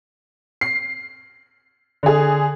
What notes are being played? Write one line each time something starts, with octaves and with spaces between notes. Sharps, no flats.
C7
D3 G#4